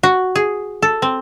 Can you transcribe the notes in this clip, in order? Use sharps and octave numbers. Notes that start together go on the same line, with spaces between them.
F#4
G#4
A4
C4